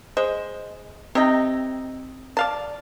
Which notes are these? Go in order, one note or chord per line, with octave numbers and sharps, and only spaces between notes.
G#3 C5 D#5
C3 C4 D#4 D#5 A#6
D5 F5 A5